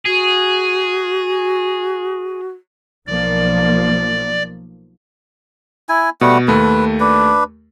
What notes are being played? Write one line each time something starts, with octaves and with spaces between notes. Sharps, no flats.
F#4 G#4
B1 F3 A#3 D5
E4 G#5
B2 G3 A3 F#5
D#2 A3 B4
D4 B4